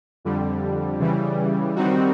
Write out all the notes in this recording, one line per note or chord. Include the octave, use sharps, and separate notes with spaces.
F2 D3 G3
C#3 E3 G3
D#3 G3 C4 D#4 F#4